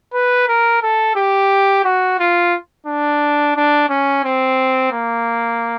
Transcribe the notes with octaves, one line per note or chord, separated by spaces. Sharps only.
B4
A#4
A4
G4
F#4
F4
D4
D4
C#4
C4
A#3